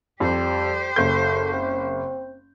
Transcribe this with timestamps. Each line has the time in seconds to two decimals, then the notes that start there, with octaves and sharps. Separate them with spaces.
0.20 F2 G3 G4 C5
0.96 F#1 A4 G6
1.53 C4